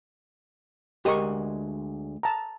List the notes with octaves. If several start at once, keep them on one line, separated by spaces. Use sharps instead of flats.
D2 G#3 G4 A#4 D#5 C#6
A5 A#5